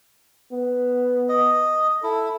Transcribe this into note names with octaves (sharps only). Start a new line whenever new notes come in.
B3
D#5
E4 A4